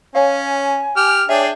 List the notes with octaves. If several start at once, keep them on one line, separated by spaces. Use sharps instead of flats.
C#4 C#5 F5 G#5
G4 F6
D4 G#4 C#5 E5 G5